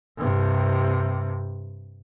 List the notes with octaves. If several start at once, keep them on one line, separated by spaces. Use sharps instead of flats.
G2 C3